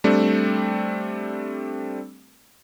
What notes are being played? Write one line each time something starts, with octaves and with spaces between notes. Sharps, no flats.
G3 A3 C4 D4